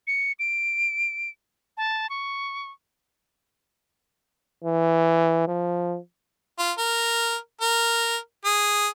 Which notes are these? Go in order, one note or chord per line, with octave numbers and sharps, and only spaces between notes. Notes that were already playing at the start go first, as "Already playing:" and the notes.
C#7
D7
A5
C#6
E3
F3
F4
A#4
A#4
G#4